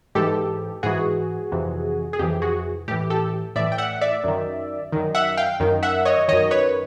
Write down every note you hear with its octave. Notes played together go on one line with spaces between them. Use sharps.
G#2 E3 G4 A4
G#2 E3 F#4 G#4
F2 C3 E3
G#4
F2 C3 E3 G4
F#4 G#4
A2 E3 G4
G4 A4
A2 E3 D5 E5
G5
E5 F#5
D5 E5
F#2 D#3
F#2 D#3
E5 F#5
F5 G5
F#2 D#3
E5 F#5
C#5 D#5
F#2 D#3 C#5 D#5
B4 C#5